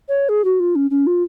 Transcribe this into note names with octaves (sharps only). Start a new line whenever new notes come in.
C#5
G#4
F#4
F4
C#4
C#4
F4